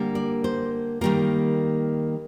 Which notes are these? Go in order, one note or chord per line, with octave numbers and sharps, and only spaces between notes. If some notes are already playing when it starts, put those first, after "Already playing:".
Already playing: D3 G3 A#3
D5
C5
D#3 G3 A#3 A#4